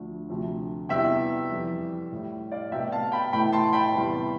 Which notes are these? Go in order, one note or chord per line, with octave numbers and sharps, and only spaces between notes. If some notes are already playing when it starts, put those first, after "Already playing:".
Already playing: D2 D3 F3 A3
D2 C3 F3 A3
E2 C3 E3 G3 E5 G5
F2 E3 G3
A2 G3
D5 F5
C2 B2 A3 E5 G5
F5 A5
G5 B5
A2 E3 A3 G5 B5
A5 C6
G5 B5
E2 C3 E3 G3